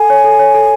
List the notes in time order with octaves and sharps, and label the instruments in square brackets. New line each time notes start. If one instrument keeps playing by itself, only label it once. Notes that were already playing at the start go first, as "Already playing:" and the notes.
Already playing: [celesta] A4 F#5 [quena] G#5
[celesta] C#5
A4
C#5
A4